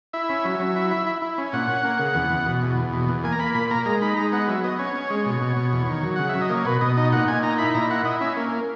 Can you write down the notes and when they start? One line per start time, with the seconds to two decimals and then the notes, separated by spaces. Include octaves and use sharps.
0.13 E4 E5
0.29 C#4
0.45 F#3
0.59 F#3
0.76 E4
0.91 E4
1.07 E4
1.22 E4
1.38 C#4
1.53 A#2 F#5
1.68 C#4
1.84 A#3
1.99 C#3
2.15 E2
2.30 E2
2.46 B2
2.62 E2
2.77 E2
2.93 B2
3.09 E2
3.23 A#3 G#5
3.32 A#5
3.39 A#3 B5
3.55 A#2 B5
3.71 A#3 A#5
3.86 G#3 A#5
4.01 D#4 B5
4.17 G#3 A#5
4.33 B3 F#5
4.48 F#3 E5
4.64 B3 D#5
4.79 C#4 C#5
4.96 C#4
5.10 G#3
5.26 B2
5.41 B2
5.57 B2
5.73 E2
5.89 D#3
6.03 F#3
6.16 C#3 F#5
6.29 E5
6.35 F#3
6.41 D#5
6.50 A#3 C#5
6.65 B2 B4
6.81 B2 D#5
6.97 D#4 D#5
7.12 A#2 F#5
7.28 A#2 G#5
7.43 D#4 A#5
7.58 E4 B5
7.74 A#2 A#5
7.90 E4 F#5
8.05 E4 D#5
8.21 C#4 E5
8.37 A#3